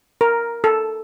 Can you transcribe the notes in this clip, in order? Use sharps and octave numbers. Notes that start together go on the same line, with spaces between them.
A#4
A4